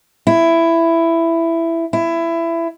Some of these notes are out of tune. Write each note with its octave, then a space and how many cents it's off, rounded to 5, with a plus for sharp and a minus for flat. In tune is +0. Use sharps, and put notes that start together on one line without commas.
E4 +10
E4 +20